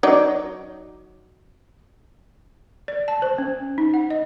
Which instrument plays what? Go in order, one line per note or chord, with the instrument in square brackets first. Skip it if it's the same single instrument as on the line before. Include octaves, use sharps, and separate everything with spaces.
[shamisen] F#3 D#4 D5
[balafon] D5
A5
C5
C#4
D#4
F#5
D#5